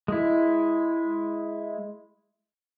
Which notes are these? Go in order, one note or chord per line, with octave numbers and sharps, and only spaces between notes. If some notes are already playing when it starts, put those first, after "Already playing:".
G#3 E4